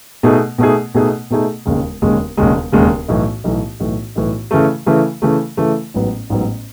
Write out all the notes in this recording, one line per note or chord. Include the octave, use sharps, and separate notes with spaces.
B2 A3 D#4 G#4
B2 A3 D#4 G#4
B2 A3 D#4 G#4
B2 A3 D#4 G#4
E1 D#2 C#3 G#3
E1 D#2 C#3 G#3
E1 D#2 C#3 G#3
E1 D#2 C#3 G#3
B1 A2 E3
B1 A2 E3
B1 A2 E3
B1 A2 E3
C#3 E3 A3
C#3 E3 A3
C#3 E3 A3
C#3 E3 A3
A1 G#2 F#3 B3
A1 G#2 F#3 B3